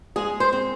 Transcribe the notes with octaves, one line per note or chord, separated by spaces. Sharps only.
G#3 G#4
C5
C4